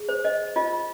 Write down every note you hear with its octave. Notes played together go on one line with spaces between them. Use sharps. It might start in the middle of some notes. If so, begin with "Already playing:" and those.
Already playing: G#4
C5
D#5
F4 D#5